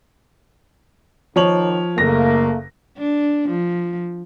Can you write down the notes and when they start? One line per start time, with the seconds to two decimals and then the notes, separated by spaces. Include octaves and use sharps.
1.36 D#2 D#3 F3 C#5 F#7
1.98 F#1 A3 A#3 A#6
2.97 D4
3.48 F3